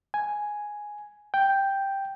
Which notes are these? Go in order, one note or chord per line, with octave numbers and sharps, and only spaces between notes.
G#5
G5